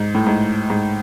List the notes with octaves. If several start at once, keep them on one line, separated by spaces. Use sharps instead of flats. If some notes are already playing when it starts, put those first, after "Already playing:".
Already playing: G#2
A2
G#2
G#2